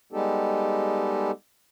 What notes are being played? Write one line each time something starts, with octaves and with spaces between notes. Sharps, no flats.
G3 G#3 B3 D#4 G4 A4